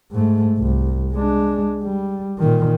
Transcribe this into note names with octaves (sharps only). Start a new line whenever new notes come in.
G#2 A3
C2
G#3 D4
G3
A#2 D#3